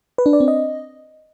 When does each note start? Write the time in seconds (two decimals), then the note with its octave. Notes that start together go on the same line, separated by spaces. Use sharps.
0.18 B4
0.26 D4
0.33 D5
0.40 C4
0.48 D#5